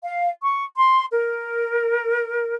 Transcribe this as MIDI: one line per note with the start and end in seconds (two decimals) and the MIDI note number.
0.04 0.30 77
0.42 0.65 85
0.77 1.06 84
1.12 2.55 70